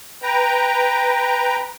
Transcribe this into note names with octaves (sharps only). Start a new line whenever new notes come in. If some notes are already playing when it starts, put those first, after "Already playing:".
B4 G5 A#5